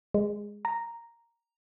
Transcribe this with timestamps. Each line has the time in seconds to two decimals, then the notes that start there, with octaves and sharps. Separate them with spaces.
0.14 G#3
0.65 A#5